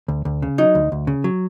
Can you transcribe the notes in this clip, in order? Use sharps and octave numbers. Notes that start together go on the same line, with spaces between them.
D2
D2
C#3
F#3 D#4
D2
D2
C#3
F#3